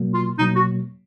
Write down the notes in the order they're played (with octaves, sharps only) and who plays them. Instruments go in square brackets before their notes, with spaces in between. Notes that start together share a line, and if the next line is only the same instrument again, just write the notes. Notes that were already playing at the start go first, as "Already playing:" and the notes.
Already playing: [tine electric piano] B2 F#3 A#3
[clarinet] F4
[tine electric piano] B2 F#3 A#3 [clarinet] D#4
[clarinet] F#4